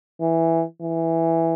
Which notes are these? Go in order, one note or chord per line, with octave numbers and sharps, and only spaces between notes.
E3
E3